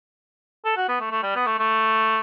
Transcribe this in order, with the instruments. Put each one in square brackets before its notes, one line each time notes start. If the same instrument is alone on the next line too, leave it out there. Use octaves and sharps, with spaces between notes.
[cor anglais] A4
F#4
B3
A3
A3
G3
B3
A3
A3